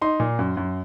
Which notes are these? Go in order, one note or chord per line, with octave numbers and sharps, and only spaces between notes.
D#4 C6
A#2
F#2
F#2